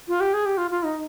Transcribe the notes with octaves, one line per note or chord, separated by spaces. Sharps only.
F4
G4
G#4
G4
F4
F4
D#4